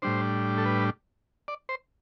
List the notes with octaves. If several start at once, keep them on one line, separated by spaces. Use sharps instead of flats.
A2 G3 D4 C5
A4
B4
D5
C5